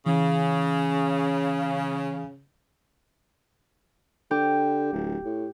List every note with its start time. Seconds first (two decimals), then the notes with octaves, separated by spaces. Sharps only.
0.06 C#3 E3
4.31 D3 G4
4.92 D1
5.25 A2